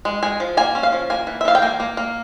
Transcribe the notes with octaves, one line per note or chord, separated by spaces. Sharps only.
G#3
G#3 G#5
F3
A#3 G#5
C#4
F5
F3
A#3 G#5
E3
E5
E3 F5
G5
A#3 G#5
A#3
A#3